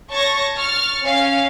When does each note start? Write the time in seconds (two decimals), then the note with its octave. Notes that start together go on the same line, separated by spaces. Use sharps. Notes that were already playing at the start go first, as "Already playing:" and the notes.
0.11 C#5 A5 C#6 G#6 A#6
0.55 C#6 F6 A6
1.04 C#4 F5